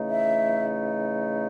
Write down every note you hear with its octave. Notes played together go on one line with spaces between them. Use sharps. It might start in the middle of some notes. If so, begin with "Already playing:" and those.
Already playing: C#3 E3 A3 D#4
E5